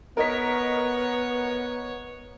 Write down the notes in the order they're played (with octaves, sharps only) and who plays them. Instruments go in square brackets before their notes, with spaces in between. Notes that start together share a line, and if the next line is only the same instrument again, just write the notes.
[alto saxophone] B3 [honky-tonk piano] A#4 D#5 B6 [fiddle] C#5